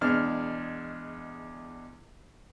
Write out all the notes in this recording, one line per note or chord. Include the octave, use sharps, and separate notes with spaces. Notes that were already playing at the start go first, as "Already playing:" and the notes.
E2 B2 G#3 D4 F6